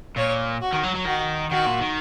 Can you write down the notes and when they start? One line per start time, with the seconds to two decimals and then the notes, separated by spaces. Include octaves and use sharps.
0.17 A#2 C#5
0.61 F#4
0.73 D#3
0.84 F#3
0.95 F#3
1.06 D#3 F#4
1.51 D#3 F#4
1.66 A#2
1.80 D#3